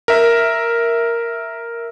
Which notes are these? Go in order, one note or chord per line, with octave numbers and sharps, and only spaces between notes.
A#4 E5